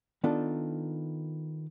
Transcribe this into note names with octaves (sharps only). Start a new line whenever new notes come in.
D#3 B3 D4 D#4 F4 A4